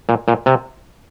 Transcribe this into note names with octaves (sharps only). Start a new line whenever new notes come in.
A#2
A#2
C3